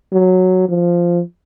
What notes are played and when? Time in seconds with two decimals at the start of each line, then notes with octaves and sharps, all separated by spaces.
0.12 F#3
0.69 F3